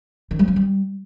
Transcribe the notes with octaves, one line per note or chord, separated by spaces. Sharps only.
D#3
G3
F#3
G3